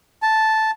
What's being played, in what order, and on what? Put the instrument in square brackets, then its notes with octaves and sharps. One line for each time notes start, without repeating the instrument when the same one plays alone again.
[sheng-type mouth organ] A5